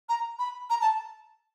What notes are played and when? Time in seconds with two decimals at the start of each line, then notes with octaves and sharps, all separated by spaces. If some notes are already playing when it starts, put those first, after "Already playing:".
0.09 A#5
0.39 B5
0.70 A#5
0.81 A5